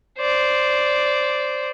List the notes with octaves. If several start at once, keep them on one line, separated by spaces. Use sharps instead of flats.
C5 D5